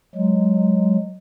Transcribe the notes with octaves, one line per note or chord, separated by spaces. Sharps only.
F#3 G#3